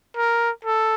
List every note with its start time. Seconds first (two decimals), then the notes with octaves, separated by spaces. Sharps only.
0.17 A#4
0.65 A4